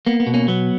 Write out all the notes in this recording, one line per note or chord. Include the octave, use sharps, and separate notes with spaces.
A#3 B3
B3
B2
A#3 C#4
F#3 B3